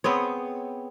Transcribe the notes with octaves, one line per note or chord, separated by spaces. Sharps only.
B3 C4 G#4 C#5